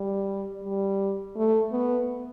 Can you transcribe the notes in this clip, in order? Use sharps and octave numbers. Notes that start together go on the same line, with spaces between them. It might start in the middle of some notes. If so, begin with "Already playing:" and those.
Already playing: G3
G3
A3
B3